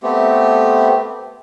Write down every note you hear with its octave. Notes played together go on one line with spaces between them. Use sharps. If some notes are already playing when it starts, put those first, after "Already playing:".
A3 B3 C4 G4